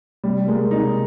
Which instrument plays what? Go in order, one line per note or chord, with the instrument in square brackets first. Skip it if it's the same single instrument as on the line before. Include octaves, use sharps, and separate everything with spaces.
[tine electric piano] C3 [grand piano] G3
[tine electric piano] G3 A#3 F4 A#4 [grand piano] G#3
[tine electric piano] C3 [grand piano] D#4